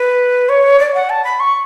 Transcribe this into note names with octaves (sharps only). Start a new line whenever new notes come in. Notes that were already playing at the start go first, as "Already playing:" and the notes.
Already playing: B4
C#5
D5
F#5
A5
B5
C#6